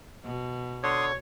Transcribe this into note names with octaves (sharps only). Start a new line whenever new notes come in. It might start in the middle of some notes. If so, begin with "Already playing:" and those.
B2
D3 C#5 C6 D#6